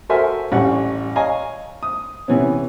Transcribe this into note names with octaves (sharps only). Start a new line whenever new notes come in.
F#4 A4 A#4 C5 E5 G#5
A1 G3 F#5 C#6
C#5 D#5 F5 G#5 A#5
D#6
C3 E3 B3 C#4